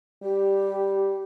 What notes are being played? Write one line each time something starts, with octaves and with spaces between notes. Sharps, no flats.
G3 G4